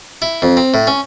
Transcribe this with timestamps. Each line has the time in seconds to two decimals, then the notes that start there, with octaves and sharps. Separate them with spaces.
0.22 E4
0.42 F2
0.57 C4
0.74 A2
0.87 C#4